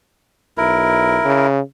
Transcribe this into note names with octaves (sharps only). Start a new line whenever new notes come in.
B1 E4 A#4
C#3